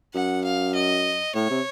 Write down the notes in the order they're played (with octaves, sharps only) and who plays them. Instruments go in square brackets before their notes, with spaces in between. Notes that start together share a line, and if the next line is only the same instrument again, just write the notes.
[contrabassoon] F#2 [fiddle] F#5
[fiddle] F5
D#5
[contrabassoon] A2 [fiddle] C#5
[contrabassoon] C3